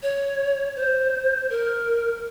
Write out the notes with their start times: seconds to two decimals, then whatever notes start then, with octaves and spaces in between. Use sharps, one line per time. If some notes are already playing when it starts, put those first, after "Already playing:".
0.03 C#5
0.76 C5
1.50 A#4